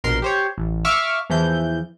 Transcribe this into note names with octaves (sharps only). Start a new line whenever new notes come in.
A#1 B2 A#4 C6
G4 C5 C#5
A1
E5 F5 C#6 D6 E6 F6
E2 E3 F3 G6